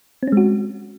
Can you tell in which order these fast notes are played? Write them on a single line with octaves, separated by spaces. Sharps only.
C4 C#4 G#3 F#4